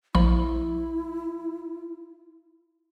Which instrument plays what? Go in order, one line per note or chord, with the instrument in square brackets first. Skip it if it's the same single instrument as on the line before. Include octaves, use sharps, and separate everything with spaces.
[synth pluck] A#1 F3 B5 [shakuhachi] E4